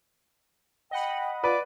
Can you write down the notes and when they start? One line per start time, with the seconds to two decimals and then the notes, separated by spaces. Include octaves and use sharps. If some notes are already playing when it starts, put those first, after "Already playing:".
0.91 D#5 F#5 G5 B5
1.44 F4 B4 D5